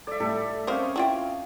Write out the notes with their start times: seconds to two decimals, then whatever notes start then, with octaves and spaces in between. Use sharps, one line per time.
0.07 A4 D5 E5
0.20 A2 G3 A3 A4
0.67 C4 C#4 A#4 C5 D#5 F5
0.96 E4 F4 G5